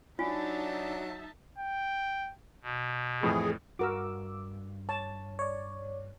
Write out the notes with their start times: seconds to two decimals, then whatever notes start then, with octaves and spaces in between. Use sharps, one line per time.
0.19 F#3 D4 D#4 F4 E5 G#5 A5
1.58 G5
2.63 B2
3.23 F2 A2 E3 G#4
3.79 G2 F#4 A#4 D6 E6
4.89 C#5 A5
5.39 C#5 D5